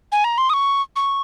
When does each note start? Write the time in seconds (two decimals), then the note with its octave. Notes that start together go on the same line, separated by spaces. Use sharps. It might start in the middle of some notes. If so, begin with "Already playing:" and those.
0.12 G#5
0.24 A#5
0.38 C6
0.49 D#6
0.53 C#6
0.96 C#6